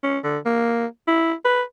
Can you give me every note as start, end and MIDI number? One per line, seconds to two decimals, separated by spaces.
0.03 0.18 61
0.24 0.38 50
0.45 0.86 58
1.07 1.33 64
1.45 1.62 71